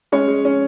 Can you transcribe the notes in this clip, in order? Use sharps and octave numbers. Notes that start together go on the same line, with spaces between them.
G#3 C#4 C#5
G#3
C#4